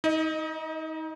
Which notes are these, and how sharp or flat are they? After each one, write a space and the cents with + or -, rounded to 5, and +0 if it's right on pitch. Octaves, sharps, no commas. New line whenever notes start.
D#4 +35 D#5 -5